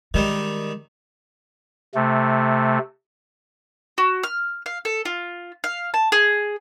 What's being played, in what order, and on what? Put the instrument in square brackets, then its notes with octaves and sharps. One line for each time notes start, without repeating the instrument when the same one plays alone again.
[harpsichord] D#3 G3 [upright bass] G#3
[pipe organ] C3 A3
[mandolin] F#4
F6
F5
A4
F4
F5
A5
G#4